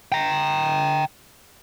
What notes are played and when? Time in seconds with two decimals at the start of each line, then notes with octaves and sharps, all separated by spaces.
0.12 G5 A#5